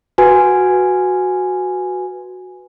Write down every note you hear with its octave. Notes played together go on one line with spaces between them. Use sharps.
F#4 B4 G#5